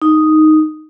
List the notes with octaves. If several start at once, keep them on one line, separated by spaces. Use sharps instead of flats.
D#4